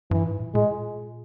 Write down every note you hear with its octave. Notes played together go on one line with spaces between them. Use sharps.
G2 E3
G#2
A#2
A#2 G#3